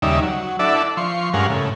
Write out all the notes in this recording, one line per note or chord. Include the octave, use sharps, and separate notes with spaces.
D#2 C#3 G3 D#4 D5 E5
F#3
D4 E4 A4 D5 E5 F#5
F3 C6 C#6
G2 G#3 C#4 A#4 F5 F#5
A2 C#3